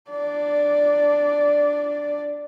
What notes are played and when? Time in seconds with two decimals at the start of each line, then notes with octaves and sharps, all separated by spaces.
0.10 D4 D5